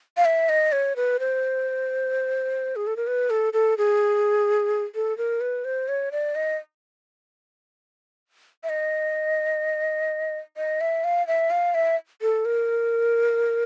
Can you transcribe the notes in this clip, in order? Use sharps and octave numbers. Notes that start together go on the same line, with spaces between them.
F5
E5
D#5
C#5
B4
C5
G#4
A4
A#4
B4
A4
A4
G#4
A4
A#4
B4
C5
C#5
D5
D#5
E5
D#5
D#5
E5
F5
E5
F5
E5
A4
A#4